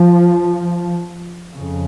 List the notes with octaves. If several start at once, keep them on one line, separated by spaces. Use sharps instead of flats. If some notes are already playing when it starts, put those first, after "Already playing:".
Already playing: F3
F2 C#3